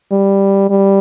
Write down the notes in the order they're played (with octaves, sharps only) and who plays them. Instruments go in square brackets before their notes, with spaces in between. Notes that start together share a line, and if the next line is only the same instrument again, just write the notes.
[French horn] G3
G3